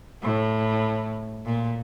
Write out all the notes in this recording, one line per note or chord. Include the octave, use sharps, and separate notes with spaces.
A2
A#2